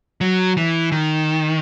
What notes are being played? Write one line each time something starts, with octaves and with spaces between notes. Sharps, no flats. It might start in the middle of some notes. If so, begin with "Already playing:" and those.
F#3
E3
D#3